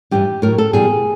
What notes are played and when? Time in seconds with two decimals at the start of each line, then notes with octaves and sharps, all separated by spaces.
0.11 G2 E3 G3 G4
0.42 A2 F#3 A#4
0.58 A4
0.73 E2 B2 G3 G#4